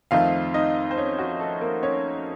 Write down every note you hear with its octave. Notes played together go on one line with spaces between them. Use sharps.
F2 D#3 A3 C4 D#4 F4 F5
D#4 D#5
C5
C#4 C#5
F#4
A4
A#3 A#4
C#4 C#5